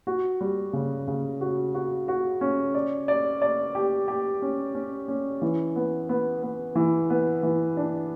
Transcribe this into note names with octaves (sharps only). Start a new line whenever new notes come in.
F#4
G3
C#3
C#3
F#4
F#4
F#4
C#4
D5
D5
D5
G4
G4
C#4
C#4
C#4
E3
B3
B3
B3
E3
B3
E3
D4